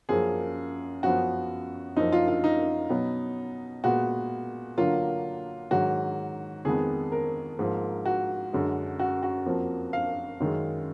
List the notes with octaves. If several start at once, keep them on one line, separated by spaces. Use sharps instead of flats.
F#2 F3 A#3 G#4
F#2 F3 B3 F#4
F#2 F3 A#3 D#4
F4
F4
D#4
B2 F#3 B3
A#2 G#3 B3 F#4
D3 F#3 A#3 F4
G#2 D#3 F#3 F#4
F2 D#3 G#3 B3 G#4
A#4
G#2 F3 A#3
F#4
F#2 D3 G#3
F#4
F#4
F2 F3 A#3
F5
F#2 D#3 G#3